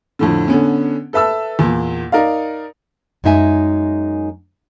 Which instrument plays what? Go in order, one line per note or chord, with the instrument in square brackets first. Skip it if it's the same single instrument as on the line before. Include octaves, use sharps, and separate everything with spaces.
[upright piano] F2 A2 D3
D3 B3 C#4
A4 B4 E5 A5 E6
E2 A#2
D#4 A#4 D5 F5
[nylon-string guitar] F#2 G#3 D#4 E5 G#5